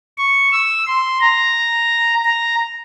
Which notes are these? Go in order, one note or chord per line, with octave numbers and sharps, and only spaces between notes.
C#6
E6
C6
A#5
A#5